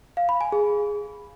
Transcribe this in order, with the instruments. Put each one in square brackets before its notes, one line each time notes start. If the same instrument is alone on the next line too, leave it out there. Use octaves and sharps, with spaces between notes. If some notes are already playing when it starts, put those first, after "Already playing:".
[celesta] F5
B5
G#5
G#4